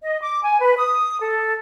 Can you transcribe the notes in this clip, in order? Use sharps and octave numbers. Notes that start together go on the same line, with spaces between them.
D#5
D6
G#5
B4
D#6
A4